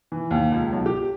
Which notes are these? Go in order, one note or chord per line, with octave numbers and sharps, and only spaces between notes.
E3
D#2
C#2
B1
G4